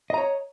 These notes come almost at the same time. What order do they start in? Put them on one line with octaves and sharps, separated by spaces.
D#5 A#5 C#5